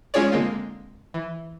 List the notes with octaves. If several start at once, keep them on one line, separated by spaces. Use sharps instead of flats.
G#3 C#4 F4 G#4 C#5 D5
D3 G#3 A#3 C4 F4
E3